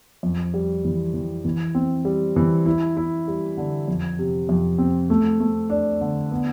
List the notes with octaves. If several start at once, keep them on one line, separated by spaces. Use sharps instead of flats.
F2
G3
E3
E3
E3
C4
G3
E3
E4
E4
G3
D3
F2
C3
F2
C4
A3
A3
D4
D3
B3